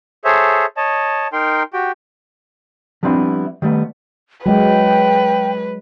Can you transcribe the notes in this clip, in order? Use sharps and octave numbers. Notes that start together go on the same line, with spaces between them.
G#4 A4 C5 C#5 E5
C#5 D#5 A5
D#4 A#4 G5 C6
F#4 G4 G5
F3 G3 B3 C4 D4 E4
D#3 G3 A3 B3
F#3 G#3 B4 G5